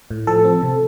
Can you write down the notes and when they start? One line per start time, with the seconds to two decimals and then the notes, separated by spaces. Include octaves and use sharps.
0.11 A2
0.27 F3 A4
0.44 C4
0.62 C3